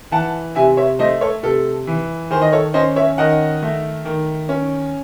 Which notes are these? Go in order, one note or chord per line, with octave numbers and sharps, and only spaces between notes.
E3 F#5 A5
C3 E5 G#5
C#5 E5
A3 C5 D#5
A4 C#5
C3 A4
E3
D#3 G#4 C5
D#5
A4 C#5
C#4 C5 D#5
C#5 E5
D#3 D#5 F#5
A3
D#3
C#4